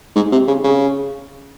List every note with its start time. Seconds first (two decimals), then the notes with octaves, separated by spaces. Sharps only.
0.16 G#2
0.32 C3
0.48 C#3
0.64 C#3